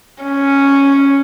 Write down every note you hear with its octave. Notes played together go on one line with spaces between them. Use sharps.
C#4